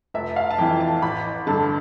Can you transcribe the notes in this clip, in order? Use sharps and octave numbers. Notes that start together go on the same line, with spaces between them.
F1 E5
F5
A5
F2 E3 G5
A5
A1 B5
G2 D3 A5